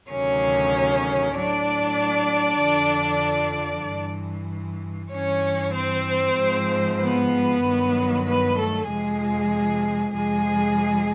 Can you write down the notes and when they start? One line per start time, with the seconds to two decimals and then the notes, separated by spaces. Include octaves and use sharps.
0.10 D2 C3 D#3 F#3 C#4 C#5
1.35 A2 D4 D5
1.40 F#3
2.60 F2 D3 F3
3.86 G2 E3
5.12 G2 E3 C#4 C#5
5.76 C4 C5
6.38 G#2 F3
7.01 B3 B4
7.63 G2 D#3 F#3
8.26 B3 B4
8.57 A3 A4
8.88 F2 C3 F3 G#3 G#4
10.14 F2 C3 F3 G#3 G#4